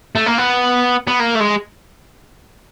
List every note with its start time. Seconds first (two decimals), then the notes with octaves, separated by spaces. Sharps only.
0.15 A3
0.26 A#3
0.38 B3
1.07 B3
1.20 A#3
1.35 A3
1.40 G#3